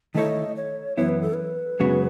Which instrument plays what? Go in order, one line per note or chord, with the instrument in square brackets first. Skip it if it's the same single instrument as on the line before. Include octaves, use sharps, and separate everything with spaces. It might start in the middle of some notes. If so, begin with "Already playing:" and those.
[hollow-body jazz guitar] D#3 A3 E4 A4 C#5 [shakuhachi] D#5
[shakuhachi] C#5
[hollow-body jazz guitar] F#2 E3 B3 E4 [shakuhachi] C#5
[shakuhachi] B4
A4
B4
[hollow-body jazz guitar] F#2 C#3 G#3 B3 F#4